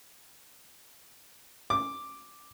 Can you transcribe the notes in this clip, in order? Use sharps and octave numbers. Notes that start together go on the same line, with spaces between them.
D6